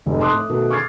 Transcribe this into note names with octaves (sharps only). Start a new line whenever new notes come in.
F1 G#2
A5 C6 D6 D#6 F#6
A2
B2 D#3 A3
C#6 D6 F6 G#6 A6 C7